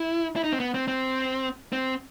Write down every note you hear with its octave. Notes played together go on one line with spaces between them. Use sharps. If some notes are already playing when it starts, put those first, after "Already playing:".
Already playing: E4
E4
D#4
C4
B3
C4
C4
C4